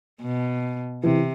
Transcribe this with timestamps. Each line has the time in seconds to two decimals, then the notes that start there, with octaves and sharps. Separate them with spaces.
0.21 B2
1.03 C3 E3